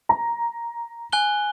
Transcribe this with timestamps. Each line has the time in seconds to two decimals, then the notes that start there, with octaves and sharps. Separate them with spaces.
0.09 A#5
1.12 G#5 F#6 G7